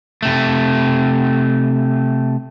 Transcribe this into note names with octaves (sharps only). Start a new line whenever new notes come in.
C3 A3